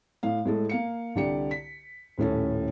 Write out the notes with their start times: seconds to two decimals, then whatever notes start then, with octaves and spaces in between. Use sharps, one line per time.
0.23 A2 F5
0.45 A2 G#3 A4
0.69 A#3 F5 C#7
1.15 C2 D3 G4 D5 C#7
1.51 B6
2.18 D#1 A2 C#4 A4